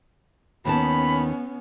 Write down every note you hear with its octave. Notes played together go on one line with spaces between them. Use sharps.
D#2 D#3 B3 C#4 A5 B5